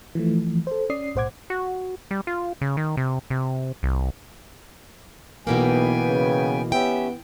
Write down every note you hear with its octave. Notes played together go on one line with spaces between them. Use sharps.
E3 F3 A3
A4 C5
C#4 D5 D#6 C7
B1 A2 C5 F#5 D6 G#6
F#4
G3
F4
C#3
D#3
C3
C3
C2
B1 B2 E3 A#3 B3 G5 G#5
C#3
B3 C#4 G4 E5 G5